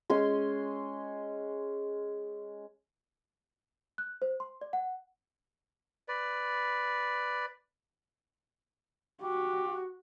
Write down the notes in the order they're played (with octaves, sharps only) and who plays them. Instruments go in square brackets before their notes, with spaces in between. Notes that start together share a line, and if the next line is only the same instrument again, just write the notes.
[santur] G#3 C#4 C6
[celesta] F#6
C5
C6
D5
F#5
[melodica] B4 D5
[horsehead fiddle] F#4 [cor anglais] G4